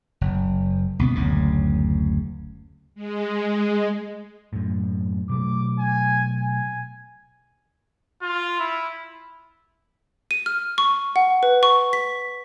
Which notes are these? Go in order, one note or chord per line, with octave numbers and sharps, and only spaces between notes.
F#1
C#2 B2 B3
F#1 D2 C#3
G#3
F#2 A2
B2 F#3 A3 D6
G#5
G#5
F4
E4
D#7
F6
C#6
F#5
B4
C#6
B6